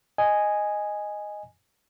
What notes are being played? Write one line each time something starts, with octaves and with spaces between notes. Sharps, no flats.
D#5 G#5